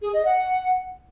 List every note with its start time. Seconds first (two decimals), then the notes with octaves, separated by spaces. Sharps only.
0.02 G#4
0.14 D#5
0.25 F#5